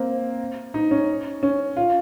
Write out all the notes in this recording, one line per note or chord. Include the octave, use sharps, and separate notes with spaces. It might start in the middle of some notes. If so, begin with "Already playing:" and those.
Already playing: A#3 C4
D#4
C#4
C#4
F4